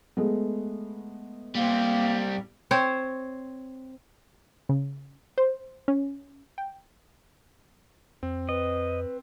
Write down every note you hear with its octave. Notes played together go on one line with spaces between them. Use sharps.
G#3 A3 B3
G3 A#3 C4
C4 C5 C#5
C#3
C5
C#4
G5
F2 C4
B4 D#5